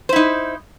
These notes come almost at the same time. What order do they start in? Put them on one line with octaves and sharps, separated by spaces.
C5 E4 D#4